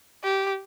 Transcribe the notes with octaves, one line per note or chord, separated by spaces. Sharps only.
G4